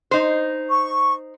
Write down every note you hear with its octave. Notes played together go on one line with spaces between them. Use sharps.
D#4 C5
C#6